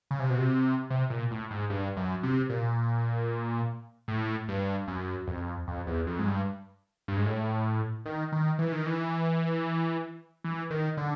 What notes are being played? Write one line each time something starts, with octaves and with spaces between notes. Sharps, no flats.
C#3
C3
B2
C3
C3
A#2
A2
G#2
G2
F#2
C3
A#2
A2
G2
F#2
F2
F2
E2
F2
G#2
G2
G2
G#2
A2
D#3
D#3
E3
D#3
E3
E3
D#3
D3